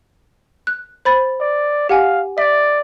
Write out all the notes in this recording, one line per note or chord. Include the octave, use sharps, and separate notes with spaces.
F#6
C5 B5 A6
D5
G4 F5 F#5 G#5
D5 E5